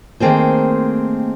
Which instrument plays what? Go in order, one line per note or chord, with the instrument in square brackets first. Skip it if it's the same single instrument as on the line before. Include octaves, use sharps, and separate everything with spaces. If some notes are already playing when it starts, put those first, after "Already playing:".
[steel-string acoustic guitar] D#3 A3 A#3 C4 G#4 C5